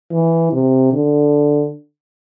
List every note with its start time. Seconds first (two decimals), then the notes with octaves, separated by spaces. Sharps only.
0.12 E3
0.53 C3
0.93 D3